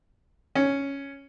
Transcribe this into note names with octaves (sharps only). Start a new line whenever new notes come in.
C#4